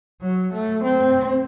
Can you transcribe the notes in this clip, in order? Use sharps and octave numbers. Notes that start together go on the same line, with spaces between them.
F#3
A3
C4